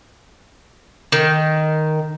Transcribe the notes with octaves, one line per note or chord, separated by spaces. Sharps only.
D#3